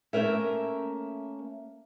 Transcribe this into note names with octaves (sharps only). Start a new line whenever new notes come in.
A3 A#3 C#4 A#4 E5